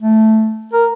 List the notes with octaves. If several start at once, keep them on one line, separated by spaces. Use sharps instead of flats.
A3
A#4